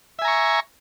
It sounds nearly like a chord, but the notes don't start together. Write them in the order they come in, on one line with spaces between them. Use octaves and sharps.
E5 G#5 A#5 C#6